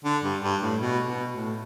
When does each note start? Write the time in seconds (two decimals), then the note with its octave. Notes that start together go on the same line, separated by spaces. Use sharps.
0.04 D3
0.24 G2
0.43 G2
0.62 A2
0.81 B2
1.07 B2
1.34 A2